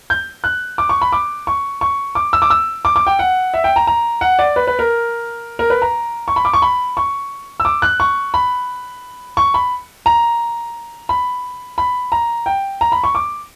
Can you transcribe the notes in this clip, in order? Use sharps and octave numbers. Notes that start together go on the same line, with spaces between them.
G6
F#6
D6
C#6
B5
D6
C#6
C#6
D6
E6
D6
E6
D6
D6
G5
F#5
E5
G5
A#5
A#5
F#5
D5
B4
B4
A#4
A#4
B4
A#5
C#6
B5
D6
C#6
B5
C#6
E6
D6
F#6
C#6
B5
C#6
B5
A#5
B5
B5
A#5
G5
A#5
B5
C#6
D6